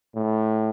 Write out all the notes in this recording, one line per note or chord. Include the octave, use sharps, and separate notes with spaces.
A2